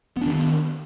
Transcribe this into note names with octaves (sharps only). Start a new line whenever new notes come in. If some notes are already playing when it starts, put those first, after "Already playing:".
D#3 B3 D4